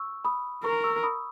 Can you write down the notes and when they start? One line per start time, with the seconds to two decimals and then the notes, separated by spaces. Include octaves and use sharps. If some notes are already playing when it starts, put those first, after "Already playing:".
Already playing: C#6 E6
0.25 B5 D#6
0.64 A#4 A#5 C#6
0.84 C#6 E6
1.03 B5 D#6